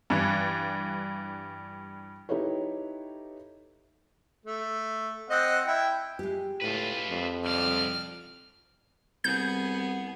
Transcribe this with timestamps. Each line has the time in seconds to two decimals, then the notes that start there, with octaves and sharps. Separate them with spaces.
0.10 G2 E3
2.29 D#4 E4 G4 A4 B4 C#5
4.46 A3
5.30 C4 D#5 F#5
5.67 E4 G5
6.19 G#3 G4
6.62 A2 F4 B4
7.09 F2
7.46 C2 D5 F6
9.24 C2 B3 G#4 G6